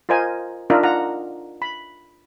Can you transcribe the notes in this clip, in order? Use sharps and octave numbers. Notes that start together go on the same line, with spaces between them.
F4 A#4 C5 D#5 G#5
D4 D#4 F4 A#4 D#5 E5
F4 F#5 A#5
B5